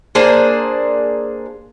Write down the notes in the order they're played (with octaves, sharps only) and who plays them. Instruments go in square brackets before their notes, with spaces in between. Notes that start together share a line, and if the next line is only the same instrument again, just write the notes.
[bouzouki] A#3 D4 G#4 C5